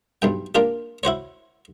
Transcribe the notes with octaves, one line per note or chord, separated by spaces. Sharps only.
B1 G2 G5
A#3 D4 F4 G4
E4 F#4 C5 C#5